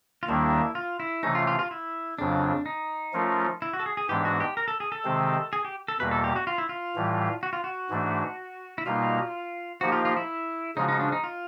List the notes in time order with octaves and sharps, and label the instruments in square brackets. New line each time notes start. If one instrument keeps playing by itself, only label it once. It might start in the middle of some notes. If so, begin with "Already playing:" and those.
[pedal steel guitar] F4
[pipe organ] D#2 D#3 G3 A#3 D4 [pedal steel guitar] E4
[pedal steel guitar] F4
E4
[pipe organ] C3 E3 A3 C#4 [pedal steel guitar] D#4
[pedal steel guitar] F4
F4
F4
E4
[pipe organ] F2 C#3 F#3 [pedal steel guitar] D4
[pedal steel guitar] D#4
[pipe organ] F3 A3 C#4 F4 A#4
[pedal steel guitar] E4
F#4
A4
G#4
G#4
[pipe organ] G#2 E3 G#3 B3 D4 [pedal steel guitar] G4
[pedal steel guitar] F#4
G4
A#4
A4
G#4
A4
[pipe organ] C3 D#3 G#3 C4
[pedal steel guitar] G#4
G4
A4
[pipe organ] E2 B2 G3 A#3 [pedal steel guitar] B4
[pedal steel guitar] A4
G4
F#4
F4
E4
F4
[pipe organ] A2 E3 G3
[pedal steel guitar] F#4
F4
F#4
[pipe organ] G#2 E3 A3 D4
[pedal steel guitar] E4
[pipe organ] B2 G3 A#3 D#4 [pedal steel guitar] F4
[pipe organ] F3 A#3 D#4 G4 [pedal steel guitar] F#4
[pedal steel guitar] F4
F4
E4
[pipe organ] C#3 F3 G#3 C#4 F#4 [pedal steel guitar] D#4
[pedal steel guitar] D#4
D4
D#4
F4